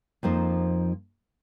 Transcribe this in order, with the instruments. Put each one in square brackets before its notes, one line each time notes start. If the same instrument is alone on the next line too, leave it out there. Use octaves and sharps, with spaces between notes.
[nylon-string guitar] F2 F3 A#3 D#4 C5